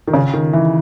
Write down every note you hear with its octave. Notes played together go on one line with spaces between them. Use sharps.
D#3
C#3
D#3
E3